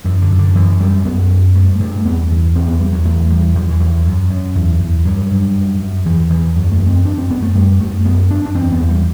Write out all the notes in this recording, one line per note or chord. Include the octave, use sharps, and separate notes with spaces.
F#2 E3
D3
F#2
D3
F#2 E3
F#2 G3
F#2 B3
F#2
G2 A3
G2 A3
E2 B3
E2
E2 C4
B3
E2 G3
F#3
E2 A3
E2 G3
E2 F#3
E3
E2 F#3
F#2
F#2
E2
E2
G2 F#3
G2
F#2
F#2
E2 E3
E2 E3
F#2 F#3
A3
F#2
C4
F#2 D4
C4
F#2 B3
A3
F#2 G3
F#2 A3
F#2 B3
F#2 D4
D4
E2 C4
B3
E2
G3